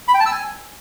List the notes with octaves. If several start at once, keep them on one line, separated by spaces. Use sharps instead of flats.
B5
G5
A5
E6
G#5